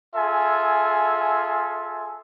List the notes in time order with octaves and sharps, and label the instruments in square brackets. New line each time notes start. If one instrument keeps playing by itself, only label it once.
[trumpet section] F4 G#4 A4 E5 G#5